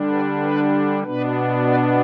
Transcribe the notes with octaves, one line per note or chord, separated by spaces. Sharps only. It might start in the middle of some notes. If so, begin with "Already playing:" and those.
Already playing: D3 G3 D4
B4 D5
B4
B2 B3 D4 B4
B4 D5